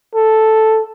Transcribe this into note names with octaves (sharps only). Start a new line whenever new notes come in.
A4